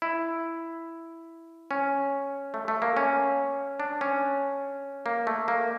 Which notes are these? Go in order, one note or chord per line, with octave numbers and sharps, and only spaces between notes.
E4
C#4
A3
A3
A#3
C#4
D4
C#4
A#3
A3
A#3